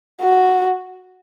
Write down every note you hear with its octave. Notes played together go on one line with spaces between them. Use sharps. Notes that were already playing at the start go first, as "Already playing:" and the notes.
F#4